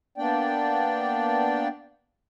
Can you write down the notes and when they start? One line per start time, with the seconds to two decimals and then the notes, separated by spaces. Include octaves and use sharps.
0.18 A#3 B3 D4 D5 G5